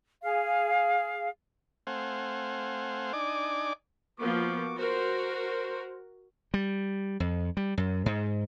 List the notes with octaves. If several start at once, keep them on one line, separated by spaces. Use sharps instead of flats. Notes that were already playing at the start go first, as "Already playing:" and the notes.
G#4 F5
A3 C4 C5 F5 F#5 G#5
D4 D#4 D5 G#5 D6
F3 A#3 B3 F#4 C#6 D6
F#4 A#4 C5
G3
F2
G3
F#2
G#2